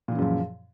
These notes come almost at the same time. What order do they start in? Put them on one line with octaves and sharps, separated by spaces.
A#2 E3 C#3 F#2 F3